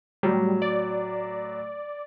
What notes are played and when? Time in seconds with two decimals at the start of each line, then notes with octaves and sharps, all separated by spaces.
0.23 A2 F#3 G3
0.62 D5